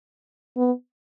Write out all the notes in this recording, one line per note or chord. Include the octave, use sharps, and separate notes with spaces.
B3